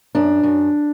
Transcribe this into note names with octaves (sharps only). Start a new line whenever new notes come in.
F#2 D4
F#2